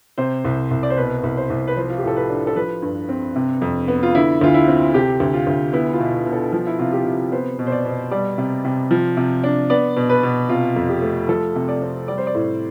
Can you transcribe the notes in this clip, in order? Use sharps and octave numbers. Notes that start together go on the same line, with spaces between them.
C3 C5
C2
C2
D5
C5
B2 B4
C2
C5
C2
B4
F3 C5
F4
G4
A2 A4
B4
D4
A4
F3 B4
G2
C4
C3
F2
B3
F4
D3 E4
D2 F4
E4
C4
C3 G4
D2
F4
D2
B3 E4
F4
B2
B2
A4
F3
E4
C3 F4
G4
C3
B3 C5
B2
C5
D5
B2
G3 D5
C3
C3
F3
C3
D4
B3 D5
B2
B4
B2
C3 F4
F2
G4
A3
F3 A4
C3
D5
C4
G3 D5
C5
D5
A2